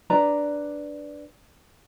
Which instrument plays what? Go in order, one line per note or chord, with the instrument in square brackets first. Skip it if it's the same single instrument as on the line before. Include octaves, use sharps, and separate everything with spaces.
[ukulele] D4 B4 D5 A#5